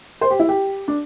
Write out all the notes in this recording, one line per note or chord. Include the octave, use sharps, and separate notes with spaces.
C5
G4
E4
G4
D4